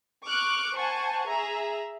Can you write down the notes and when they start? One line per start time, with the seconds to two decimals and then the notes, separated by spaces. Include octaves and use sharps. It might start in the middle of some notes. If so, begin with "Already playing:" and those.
0.25 C#6 D6 F6 F#6
0.77 C5 F#5 G#5 A5 C#6
1.27 G#4 E5 A#5